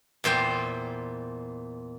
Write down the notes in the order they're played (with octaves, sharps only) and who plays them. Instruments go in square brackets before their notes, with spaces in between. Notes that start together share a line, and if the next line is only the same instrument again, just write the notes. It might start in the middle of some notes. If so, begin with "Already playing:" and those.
[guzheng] E2 A#2 C5 G5